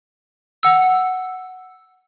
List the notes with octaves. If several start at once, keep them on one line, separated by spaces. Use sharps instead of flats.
F#5 E6